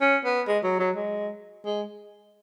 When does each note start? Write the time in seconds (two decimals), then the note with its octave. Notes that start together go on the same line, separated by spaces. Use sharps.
0.01 C#4
0.25 B3
0.47 G#3
0.64 F#3
0.79 F#3
0.95 G#3
1.65 G#3